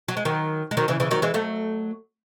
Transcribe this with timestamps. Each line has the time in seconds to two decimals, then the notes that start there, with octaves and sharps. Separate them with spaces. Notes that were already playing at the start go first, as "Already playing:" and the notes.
0.08 F#3
0.17 G#3
0.25 D#3 F#3
0.71 G#3
0.77 D#3 F#3
0.88 C#3 E3
1.00 C#3 E3
1.11 D#3 F#3
1.22 E3 G#3
1.34 F#3 A3